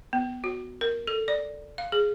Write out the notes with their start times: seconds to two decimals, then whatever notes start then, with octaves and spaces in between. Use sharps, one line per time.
0.13 B3
0.44 F#4
0.81 A#4
1.07 A4
1.28 D5
1.78 F5
1.92 G#4